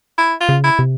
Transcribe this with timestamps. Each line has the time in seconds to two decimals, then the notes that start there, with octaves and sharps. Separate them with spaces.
0.18 E4
0.41 F4
0.49 C#3
0.64 E4
0.79 C3